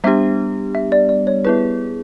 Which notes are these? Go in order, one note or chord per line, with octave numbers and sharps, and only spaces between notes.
G3 B3 D4 G4 E5
E5
D5
D5
C#5
B3 E4 G#4 B4